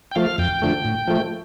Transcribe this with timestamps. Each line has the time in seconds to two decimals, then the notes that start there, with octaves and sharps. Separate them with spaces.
0.11 G5
0.15 F3 A3 F5
0.38 F2 G5
0.62 D3 F3 A3
0.85 A2
1.07 F3 A3